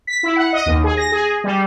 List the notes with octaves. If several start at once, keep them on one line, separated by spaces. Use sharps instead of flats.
B6
E4
F#5
D#5
D#2
G#4
A#6
G#4
G3